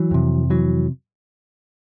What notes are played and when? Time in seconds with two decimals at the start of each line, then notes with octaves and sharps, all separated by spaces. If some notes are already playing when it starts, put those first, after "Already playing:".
Already playing: E3 F#3
0.11 F2 C3
0.50 E3 F#3